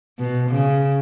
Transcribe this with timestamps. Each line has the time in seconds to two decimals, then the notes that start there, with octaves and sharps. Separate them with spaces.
0.19 B2
0.50 C#3